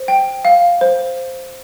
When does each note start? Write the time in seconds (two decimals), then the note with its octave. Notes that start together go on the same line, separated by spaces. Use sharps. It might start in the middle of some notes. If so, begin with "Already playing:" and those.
Already playing: C5
0.08 G5
0.45 F5
0.81 C5